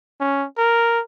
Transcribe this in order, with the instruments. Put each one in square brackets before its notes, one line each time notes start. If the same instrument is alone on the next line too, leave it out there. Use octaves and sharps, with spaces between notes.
[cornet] C#4
A#4